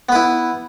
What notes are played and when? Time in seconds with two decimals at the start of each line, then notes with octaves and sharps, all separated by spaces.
0.09 B3
0.12 B4
0.15 E4